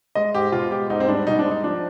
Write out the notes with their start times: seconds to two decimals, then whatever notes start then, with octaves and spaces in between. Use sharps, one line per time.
0.15 G#3 D#5
0.34 G#2 G4
0.52 B2 F4
0.71 G#3 G4
0.90 G#2 D#4
1.00 C4
1.08 G3 D4
1.27 B2 D#4
1.39 D4
1.45 G#3
1.51 D#4
1.64 F3 D4